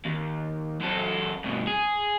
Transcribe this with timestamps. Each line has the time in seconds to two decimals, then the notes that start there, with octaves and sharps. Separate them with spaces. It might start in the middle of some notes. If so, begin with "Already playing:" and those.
0.05 D#2
0.80 F#2 A4
1.44 G2 B2
1.67 G#4